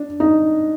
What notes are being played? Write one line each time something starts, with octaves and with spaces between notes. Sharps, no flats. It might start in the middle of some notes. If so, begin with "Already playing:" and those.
Already playing: D4
D#4